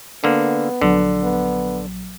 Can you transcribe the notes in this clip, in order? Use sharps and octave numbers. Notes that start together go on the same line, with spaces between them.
D3 A#3 B3
A#1 D3 F#3
B3